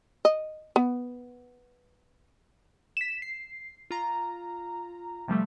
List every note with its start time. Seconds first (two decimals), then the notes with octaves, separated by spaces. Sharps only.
0.25 D#5
0.76 B3
2.97 B6 E7
3.22 C7
3.91 F4 A#5
5.28 C3 F3 G3 A3